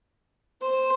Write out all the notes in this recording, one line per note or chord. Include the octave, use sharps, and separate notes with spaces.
C5